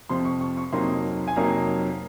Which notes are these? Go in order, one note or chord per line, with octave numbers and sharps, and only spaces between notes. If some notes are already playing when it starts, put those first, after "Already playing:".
F2 C3 F3 C6
C#6
C#6
C#6
F2 C3 F#3 A#3 D#4 C6
G#5
F2 C3 F#3 A#3 D#4 A#5